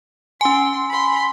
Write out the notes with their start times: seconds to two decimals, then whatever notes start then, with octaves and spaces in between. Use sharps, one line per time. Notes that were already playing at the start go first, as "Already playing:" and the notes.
0.41 C#4 G#5 C6
0.90 B5 C6